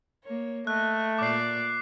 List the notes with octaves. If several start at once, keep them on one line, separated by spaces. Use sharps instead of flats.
A#3 C#5
A3 D#5 F#6
A#2 D5 D6 C7